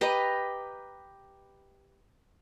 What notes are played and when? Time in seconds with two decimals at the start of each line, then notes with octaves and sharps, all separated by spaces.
0.01 G4 B4 D#5 A#5